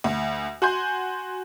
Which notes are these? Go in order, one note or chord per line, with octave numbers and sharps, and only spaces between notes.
D2
F#4 G#5 C6 G6